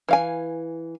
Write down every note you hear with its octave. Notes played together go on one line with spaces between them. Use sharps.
E3 F5 G#5